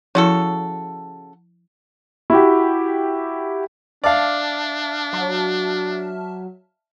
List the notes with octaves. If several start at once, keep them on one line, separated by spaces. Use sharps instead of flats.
C#3 F3 E4 F#4 A4
E4 F#4 G4
D4 D5 E5 F5 A5 F6
F#3